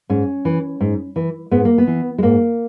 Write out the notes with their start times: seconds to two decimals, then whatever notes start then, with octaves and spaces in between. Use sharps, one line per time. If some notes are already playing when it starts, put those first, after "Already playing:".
0.09 G#2 C#4
0.45 E3
0.80 G#2
1.16 E3
1.51 G#2 B3
1.65 A#3
1.78 B3
1.87 E3
2.18 G#3
2.23 G#2 A#3